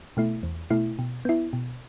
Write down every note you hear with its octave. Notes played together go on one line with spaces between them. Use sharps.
B2 A3 E4
E2
B2 A3 E4
B2
B3 E4
B2